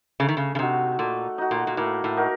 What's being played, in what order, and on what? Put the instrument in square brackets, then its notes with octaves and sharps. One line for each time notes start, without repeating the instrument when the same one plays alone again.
[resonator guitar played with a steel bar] C#3 [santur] A3
[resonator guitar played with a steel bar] D#3
C#3
C#3
[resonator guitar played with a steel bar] C3 [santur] D#4 F#4
[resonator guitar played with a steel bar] A#2 [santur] A3
[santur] D#4 F#4
[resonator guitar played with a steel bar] A#2
A#2
[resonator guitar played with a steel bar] A2 [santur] A#3
[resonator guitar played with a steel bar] A2
[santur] D#4 F#4 A#4